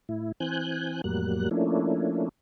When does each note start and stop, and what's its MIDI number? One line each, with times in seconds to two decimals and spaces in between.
0.09 0.32 45
0.09 0.32 64
0.40 1.01 52
0.40 1.01 60
0.40 1.01 80
0.40 1.01 90
0.40 1.01 91
1.04 1.49 41
1.04 1.49 45
1.04 1.49 54
1.04 1.49 55
1.04 1.49 58
1.04 1.49 90
1.51 2.29 53
1.51 2.29 57
1.51 2.29 58
1.51 2.29 61
1.51 2.29 62
1.51 2.29 64